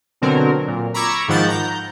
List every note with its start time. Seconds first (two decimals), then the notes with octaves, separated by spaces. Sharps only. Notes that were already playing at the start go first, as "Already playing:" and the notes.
0.21 B2 D3 F#3 C4 A#4
0.68 A#2
0.94 A#5 B5 C#6 D6 E6 G#6
1.28 G#2 D#3 F3 F#5 G6 A6
1.48 A#5 G6